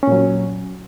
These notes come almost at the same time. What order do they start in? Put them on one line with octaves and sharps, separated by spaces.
C#4 A#2 F#3